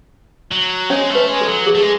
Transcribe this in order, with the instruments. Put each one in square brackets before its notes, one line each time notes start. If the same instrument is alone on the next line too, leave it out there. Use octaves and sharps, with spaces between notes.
[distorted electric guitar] F#3
[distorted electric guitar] G#3 [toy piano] C#4 C#5
[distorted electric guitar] A3
[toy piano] B4
[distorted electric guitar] G#3
[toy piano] A4
[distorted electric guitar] F#3
[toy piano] G#4
[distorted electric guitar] A3
G#3